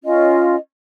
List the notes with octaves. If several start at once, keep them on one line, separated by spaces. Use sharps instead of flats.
C#4 F4 D#5